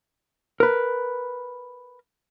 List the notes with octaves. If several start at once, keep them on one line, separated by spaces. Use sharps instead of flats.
A#4 B4